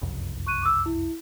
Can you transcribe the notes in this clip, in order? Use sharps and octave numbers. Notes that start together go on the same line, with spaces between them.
F#1 C2 F2
C#6 F#6 D#7
D6 E6
E4